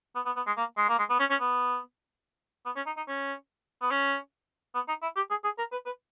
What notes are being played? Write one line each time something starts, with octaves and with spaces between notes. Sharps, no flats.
B3
B3
B3
G#3
A#3
G#3
A#3
G#3
B3
C#4
C#4
B3
B3
C#4
D#4
D#4
C#4
B3
C#4
B3
D#4
E4
G4
G#4
G#4
A#4
B4
B4